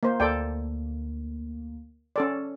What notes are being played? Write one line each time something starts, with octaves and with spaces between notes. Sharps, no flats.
A#3 C5
D2 A#3 A4 D5 G5
C#4 A4 D5